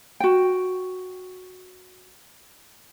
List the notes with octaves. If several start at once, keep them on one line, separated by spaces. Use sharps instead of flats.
F#4 G5